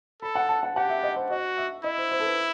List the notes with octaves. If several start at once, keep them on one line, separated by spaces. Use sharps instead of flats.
A4 B5
F#5
A5
F#5
G4 F#5
E5
D#5
C5
F#4 D#5
E5
E4 D#5
C5
C5
A4
B4